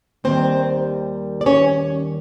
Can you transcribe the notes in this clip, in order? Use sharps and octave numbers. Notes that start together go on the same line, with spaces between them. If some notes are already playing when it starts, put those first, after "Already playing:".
D#2 D#3 G3 C4 C5
D5
C#4 C#5